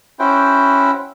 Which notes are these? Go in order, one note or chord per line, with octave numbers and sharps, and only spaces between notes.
C#4 E4 F#4 C5 G5